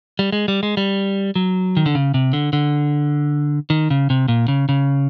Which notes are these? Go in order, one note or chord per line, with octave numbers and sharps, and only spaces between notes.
G3
G#3
G3
G#3
G3
F#3
D#3
D3
C#3
C3
D3
D3
D#3
C#3
C3
A#2
C#3
C#3